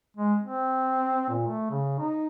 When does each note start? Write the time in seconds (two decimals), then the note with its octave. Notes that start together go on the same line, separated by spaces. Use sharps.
0.17 G#3
0.43 C4
1.29 A#2
1.47 A3
1.70 C#3
1.99 D#4